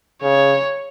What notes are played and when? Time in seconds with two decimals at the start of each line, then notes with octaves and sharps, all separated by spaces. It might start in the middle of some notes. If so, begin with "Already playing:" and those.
0.22 C#3 C#5